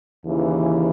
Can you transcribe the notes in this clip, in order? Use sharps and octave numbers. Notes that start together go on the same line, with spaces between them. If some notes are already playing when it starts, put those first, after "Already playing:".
D#2 C#3 E3